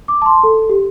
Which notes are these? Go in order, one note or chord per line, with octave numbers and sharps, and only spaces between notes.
D6
A5
C6
A4
G4